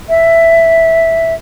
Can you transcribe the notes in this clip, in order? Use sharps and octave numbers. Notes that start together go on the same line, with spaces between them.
E5